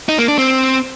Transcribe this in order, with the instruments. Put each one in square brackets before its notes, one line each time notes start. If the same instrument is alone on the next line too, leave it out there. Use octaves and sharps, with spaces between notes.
[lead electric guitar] D#4
A#3
D4
C4